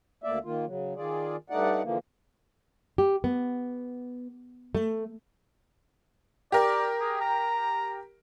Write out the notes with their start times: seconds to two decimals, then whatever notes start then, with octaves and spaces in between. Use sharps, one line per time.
0.24 D2 A#3 D5 E5
0.44 D#3 A#3 F4
0.66 C#3 F#3
0.96 D#3 F4 G#4 D5
1.50 G2 A3 D#4 D5 F#5
1.83 D3 E3 F3 A#3
2.98 G4
3.24 B3
4.75 A3
6.52 G4 A#4 D5
7.01 G#4
7.21 A#5